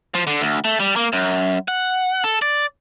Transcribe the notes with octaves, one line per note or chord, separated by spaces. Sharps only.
F3
D3
D2
A3
G3
A#3
F#2
F#5
A4
D5